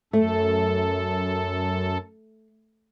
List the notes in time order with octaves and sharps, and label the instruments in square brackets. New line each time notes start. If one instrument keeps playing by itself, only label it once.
[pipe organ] F#2 A4 [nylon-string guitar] A3